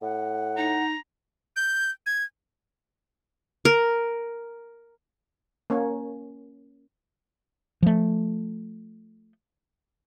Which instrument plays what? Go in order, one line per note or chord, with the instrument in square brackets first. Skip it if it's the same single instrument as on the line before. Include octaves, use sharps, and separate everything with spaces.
[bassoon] A2 [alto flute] F#5
[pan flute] D#4 [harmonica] A#5
[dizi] G6
G#6
[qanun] A#4
[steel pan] A#3 C#4 C#5
[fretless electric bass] F3 A3